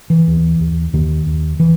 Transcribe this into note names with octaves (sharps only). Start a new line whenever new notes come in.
E3
D#2
D#2
D#2 D#3
D#2
E3